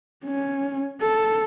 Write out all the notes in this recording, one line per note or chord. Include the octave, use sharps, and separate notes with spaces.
C#4
A4